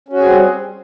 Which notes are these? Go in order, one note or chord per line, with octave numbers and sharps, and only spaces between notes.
G3 C4 C#4 F#4 G#4